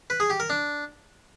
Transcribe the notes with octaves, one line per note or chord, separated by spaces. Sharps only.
B4
G#4
G4
A#4
D4